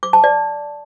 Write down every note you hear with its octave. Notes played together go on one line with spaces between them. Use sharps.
D6
A5
D5